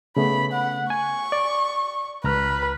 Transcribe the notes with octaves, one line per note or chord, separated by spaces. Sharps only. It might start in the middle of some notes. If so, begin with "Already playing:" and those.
C#3 A3 B3 B5
F#5
G#5 C#6
D5
C#2 B4 A#5 F6